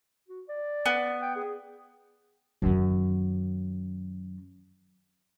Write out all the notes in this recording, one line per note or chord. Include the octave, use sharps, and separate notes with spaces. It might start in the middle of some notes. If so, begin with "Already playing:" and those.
F#4
D5
B3
G5
G#4
F#2 D#3